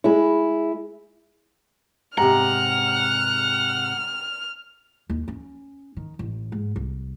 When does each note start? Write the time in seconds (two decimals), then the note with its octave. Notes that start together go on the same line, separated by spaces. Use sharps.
0.04 G#3 E4
2.18 G#2 C3 G4 F#5 A#5 F6
5.10 D#2
5.28 C#4
5.97 D#3
6.19 A1
6.52 G#2
6.76 C2